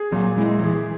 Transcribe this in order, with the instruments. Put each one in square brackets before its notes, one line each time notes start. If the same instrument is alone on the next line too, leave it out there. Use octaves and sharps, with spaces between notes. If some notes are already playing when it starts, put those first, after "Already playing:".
Already playing: [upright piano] G#4
[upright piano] A#2 [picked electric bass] F#3
[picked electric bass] G#3 [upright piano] E4
[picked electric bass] F#3
[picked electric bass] E3 [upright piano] G#4